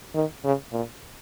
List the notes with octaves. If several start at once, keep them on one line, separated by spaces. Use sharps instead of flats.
D#3
C#3
A#2